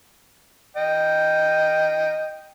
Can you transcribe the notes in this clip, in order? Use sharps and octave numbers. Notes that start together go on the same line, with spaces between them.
D#5 G5